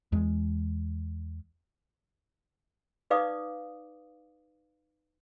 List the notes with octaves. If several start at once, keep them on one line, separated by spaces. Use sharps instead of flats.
E2 G#3
D#4 B4 D5 F5 D6 D#6